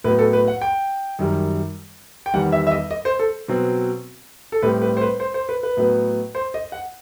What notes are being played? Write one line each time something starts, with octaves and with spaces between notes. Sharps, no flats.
A2 F#3 B3 B4
A4
B4
F#5
G5
F#2 D#3 G3
G5
E2 D#3 G3 F#5
E5
E5
D#5
D#5
C5
A4
B2 F#3 C4
A4
A2 G3 C4 B4
B4
C5
B4
C5
C5
B4
B4
A2 F#3 B3
C5
D#5
F#5